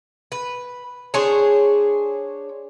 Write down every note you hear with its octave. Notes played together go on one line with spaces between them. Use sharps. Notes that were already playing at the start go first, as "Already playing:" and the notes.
B4
D4 G#4 C5 C#5